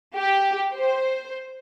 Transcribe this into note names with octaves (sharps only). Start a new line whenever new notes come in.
G4
C5